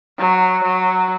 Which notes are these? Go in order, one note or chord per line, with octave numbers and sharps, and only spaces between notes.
F#3
F#3